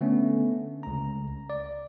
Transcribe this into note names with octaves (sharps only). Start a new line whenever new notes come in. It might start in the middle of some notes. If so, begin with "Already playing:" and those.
D3 A3 B3 C#4
C#2 A#5
D5